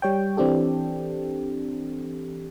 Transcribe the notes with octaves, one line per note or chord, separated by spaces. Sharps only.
G3 C#5 G5
E3 C4 D4 G4 A4